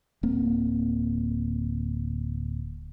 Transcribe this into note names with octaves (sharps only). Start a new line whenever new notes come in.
D1 A#3 C4